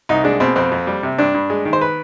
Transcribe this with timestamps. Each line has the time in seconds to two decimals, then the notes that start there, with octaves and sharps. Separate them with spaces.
0.09 C2 D#4
0.24 G#3 D4
0.40 B2 C4
0.56 F2 C4
0.72 F2
0.87 G3
1.03 C3
1.18 G2 D4
1.34 G2
1.50 G#3
1.65 D#3
1.73 C5
1.81 B4